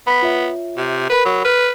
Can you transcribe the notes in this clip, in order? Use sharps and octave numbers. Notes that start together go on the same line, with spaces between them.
B3 B5 B6
F4 C#5 E5
C3
A#4 B4 B5
F#3
B4 F6